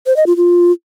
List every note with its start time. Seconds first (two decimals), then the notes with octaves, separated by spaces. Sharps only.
0.06 C5
0.16 D#5
0.26 F4
0.37 F4